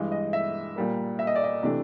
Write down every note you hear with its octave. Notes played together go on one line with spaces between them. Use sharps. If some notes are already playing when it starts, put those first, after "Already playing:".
Already playing: G2 E3 G#3
D#5
E5
A#2 G3 A#3
E5
D#5
D5
D#5
C3 E3 A3 D4